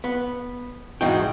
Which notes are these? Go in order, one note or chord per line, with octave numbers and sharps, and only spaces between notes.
B3
E2 G#2 B2 D#4 F#4 G5